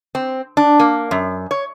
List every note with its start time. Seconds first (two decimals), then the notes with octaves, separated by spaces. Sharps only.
0.15 C4
0.57 D4
0.80 A#3
1.11 F#2
1.51 C#5